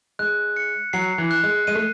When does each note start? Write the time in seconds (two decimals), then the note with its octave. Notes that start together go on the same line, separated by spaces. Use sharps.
0.19 G#3 F#6
0.56 C#7
0.93 F#3 C7
1.18 E3
1.31 F#6
1.43 G#3
1.67 G#3 D#7
1.75 A3